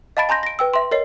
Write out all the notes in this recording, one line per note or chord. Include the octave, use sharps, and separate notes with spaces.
D#5 F5 A5 B5 A6 D7
G#5 A#5 C6 G6 A#6
A#6 D7
B4 G5 E6
E5 C6
A#4 C#5 D#5 C7